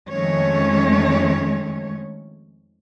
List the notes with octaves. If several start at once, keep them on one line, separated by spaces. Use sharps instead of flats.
F2 D#3 G#3 A3 C#4 C#5